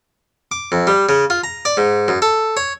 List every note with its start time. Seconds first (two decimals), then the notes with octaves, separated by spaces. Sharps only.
0.51 D6
0.72 F2
0.87 G3
1.09 C#3
1.30 F4
1.44 A#5
1.65 D5
1.77 G#2
2.08 F#2
2.22 A4
2.57 C#5